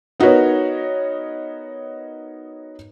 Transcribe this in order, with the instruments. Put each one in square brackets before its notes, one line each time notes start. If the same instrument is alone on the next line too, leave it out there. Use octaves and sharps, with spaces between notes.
[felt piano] B3 D#4 F#4 A#4 B4 C#5